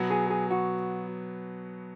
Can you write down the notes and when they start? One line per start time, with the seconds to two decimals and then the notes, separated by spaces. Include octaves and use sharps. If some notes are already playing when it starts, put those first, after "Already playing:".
Already playing: B2 F#3 B3
0.10 G#4
0.30 G#4
0.50 F#4